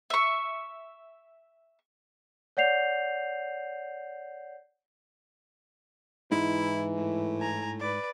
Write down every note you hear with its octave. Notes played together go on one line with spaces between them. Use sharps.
E5 C#6
C#5 D5 F#5 G6 C7 F7
G#2 E3 G#3 D#4 E4
A2
G#5 A#5
B4 D5